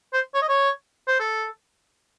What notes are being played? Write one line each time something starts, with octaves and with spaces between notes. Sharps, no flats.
C5
C#5
D#5
C#5
C5
A4